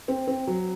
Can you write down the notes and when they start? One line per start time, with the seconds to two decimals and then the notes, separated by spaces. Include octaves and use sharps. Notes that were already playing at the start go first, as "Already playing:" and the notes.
0.08 C4
0.27 C4
0.47 F#3